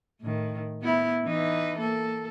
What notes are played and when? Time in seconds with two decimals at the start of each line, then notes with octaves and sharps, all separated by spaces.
0.21 A2 D#3
0.81 B3 E4
1.25 E3 D#4 B4
1.78 A#3 A4